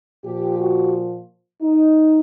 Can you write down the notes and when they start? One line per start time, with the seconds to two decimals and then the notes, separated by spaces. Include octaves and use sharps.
0.24 A#2 F3 G4
0.58 F#4
1.62 D#4